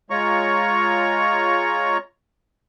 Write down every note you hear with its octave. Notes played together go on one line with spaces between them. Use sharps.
G#3 F4 C#5 A#5 C#6